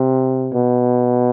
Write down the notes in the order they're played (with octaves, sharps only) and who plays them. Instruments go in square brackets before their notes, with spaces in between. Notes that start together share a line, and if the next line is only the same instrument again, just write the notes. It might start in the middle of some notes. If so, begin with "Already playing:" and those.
Already playing: [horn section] C3
B2